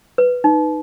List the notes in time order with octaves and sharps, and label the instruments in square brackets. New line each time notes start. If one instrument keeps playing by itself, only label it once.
[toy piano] B4
D#4